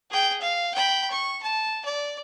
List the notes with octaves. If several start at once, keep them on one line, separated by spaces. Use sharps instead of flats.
G#4 G5
F5
G5 B5
C#6
A5
D5